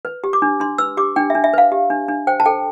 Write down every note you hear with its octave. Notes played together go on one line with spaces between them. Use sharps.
B4
G4
D6
D4
D4 C6
B4 E6
G4 D6
D4 G5
E5
D4
E5
B4 F5
G4
D4
D4
C5 G5
A5
A4 G5